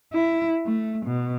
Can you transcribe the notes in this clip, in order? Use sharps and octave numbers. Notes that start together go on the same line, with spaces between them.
E4
A3
B2